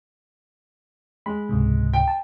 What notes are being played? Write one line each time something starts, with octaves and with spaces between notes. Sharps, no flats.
G#3 B5
C#2 G#2 C3
G5
A5